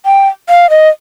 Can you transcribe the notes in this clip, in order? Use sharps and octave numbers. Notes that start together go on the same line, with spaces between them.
G5
F5
D#5